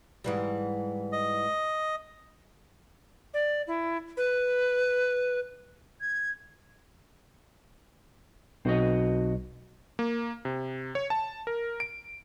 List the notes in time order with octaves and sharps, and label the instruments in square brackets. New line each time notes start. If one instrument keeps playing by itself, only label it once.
[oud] G#2 E3 G3
[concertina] D#5
[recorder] D5
E4
B4
[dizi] G#6
[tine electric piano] B1 [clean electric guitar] C4 F#4 D#5
[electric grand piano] A#3
C3
C#5
A5
A#4
D7